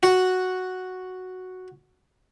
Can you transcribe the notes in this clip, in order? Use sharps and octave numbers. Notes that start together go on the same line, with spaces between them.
F#4 F#5